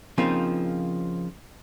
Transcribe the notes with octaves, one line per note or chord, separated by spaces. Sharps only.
C#3 F3 A#3 C4 D#4 F4